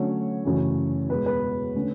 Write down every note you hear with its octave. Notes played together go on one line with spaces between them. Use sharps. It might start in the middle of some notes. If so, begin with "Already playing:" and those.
Already playing: D3 F#3 A3 C#4 C#5
F#2 C#3 E3 A3 C#4
E2 B2 G#3 B4
B4
D3 A3 C#4